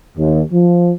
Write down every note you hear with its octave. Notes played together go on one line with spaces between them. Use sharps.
D#2
F3